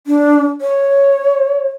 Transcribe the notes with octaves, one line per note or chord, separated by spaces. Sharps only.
D4
C#5